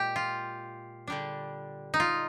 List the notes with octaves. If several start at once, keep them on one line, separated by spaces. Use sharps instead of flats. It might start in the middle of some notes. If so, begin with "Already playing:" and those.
Already playing: A#2 G#3 G4
F4
D3 G3 D4
D#4
F4